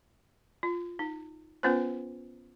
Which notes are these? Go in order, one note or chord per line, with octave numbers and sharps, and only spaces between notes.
F4
D#4
B3 C#4 F4 B4 C5